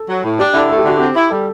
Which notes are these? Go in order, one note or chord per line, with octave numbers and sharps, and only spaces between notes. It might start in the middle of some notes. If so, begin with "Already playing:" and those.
Already playing: A4
F#3
A2
D4 G4
D3 E4
A3 A4
G4
D3 F#4
C4 G4
E4
G3 A4